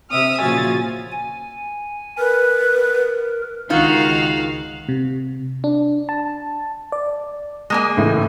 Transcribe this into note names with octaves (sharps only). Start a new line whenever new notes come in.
C3 E5 D#6 F6
A#2 C#3 F3 F#4 G#5 A6
G#5
A#4 B4
C#2 D#3 D#4 F4 F#4 F5
C3
D4
A5
D5
G#3 A#3 G#5
C#2 A2 E3